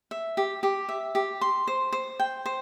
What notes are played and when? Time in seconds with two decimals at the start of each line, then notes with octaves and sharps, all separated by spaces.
0.11 E5
0.37 G4
0.63 G4
0.89 E5
1.15 G4
1.41 C6
1.67 C5
1.92 C5
2.20 G5
2.46 C5